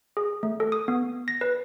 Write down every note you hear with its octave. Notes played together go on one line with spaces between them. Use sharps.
G#4
A3
A4
D#6
B3
A#6
B4